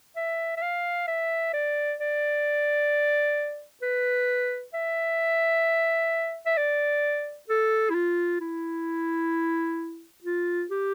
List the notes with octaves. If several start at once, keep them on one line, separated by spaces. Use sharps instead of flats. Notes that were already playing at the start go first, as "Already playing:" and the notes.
E5
E5
F5
E5
D5
D5
B4
E5
E5
D5
A4
E4
F4
E4
F4
G4